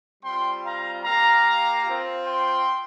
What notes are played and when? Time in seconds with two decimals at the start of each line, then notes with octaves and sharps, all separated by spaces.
0.24 G3 C4 F4 G5 C6
0.64 F5 A#5
1.04 A#3 G4 F5 A#5
1.85 C4 F4
2.25 G5 C6